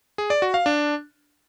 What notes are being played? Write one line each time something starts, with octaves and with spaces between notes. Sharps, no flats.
G#4
D5
F#4
F5
D4